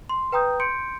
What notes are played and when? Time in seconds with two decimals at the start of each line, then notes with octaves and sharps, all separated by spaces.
0.09 C6
0.32 B4 G5 A#5 D#6 G6
0.60 C6 G6 C#7 D7